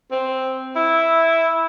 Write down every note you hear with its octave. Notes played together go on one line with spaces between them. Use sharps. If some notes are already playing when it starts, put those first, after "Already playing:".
C4
E4